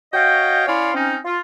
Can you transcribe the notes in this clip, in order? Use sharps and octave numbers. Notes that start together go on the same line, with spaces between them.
F#4 C#5 D#5 F5 G5
C#4 E4 C#5 D5 F5 C6
C4 C#4 D#4
F4